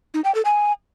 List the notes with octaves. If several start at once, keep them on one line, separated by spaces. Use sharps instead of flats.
D#4
G5
A4
G#5